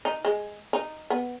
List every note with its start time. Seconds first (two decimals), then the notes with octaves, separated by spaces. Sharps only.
0.05 D#4
0.25 G#3
0.73 D#4
1.10 B3